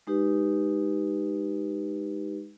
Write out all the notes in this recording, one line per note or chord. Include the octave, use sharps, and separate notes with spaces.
G#3 D#4 G4 B4